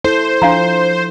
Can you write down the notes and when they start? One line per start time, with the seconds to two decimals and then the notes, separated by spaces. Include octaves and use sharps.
0.04 E4 A4 C5
0.42 F3 D4 F5 A#5